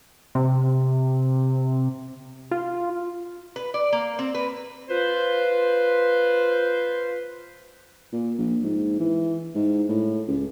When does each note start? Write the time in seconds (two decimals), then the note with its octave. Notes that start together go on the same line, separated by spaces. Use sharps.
0.35 C3
2.51 F4
3.56 B4
3.74 D5
3.92 A#3
4.19 C4
4.34 B4
4.89 F4 B4 C5
8.12 A#2
8.38 A#1
8.63 G#2
8.99 E3
9.55 G#2
9.89 A2
10.28 C#2